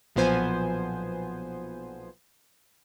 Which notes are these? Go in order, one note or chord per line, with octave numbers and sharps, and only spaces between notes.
B1 A#2 F3 B3 C5 G#5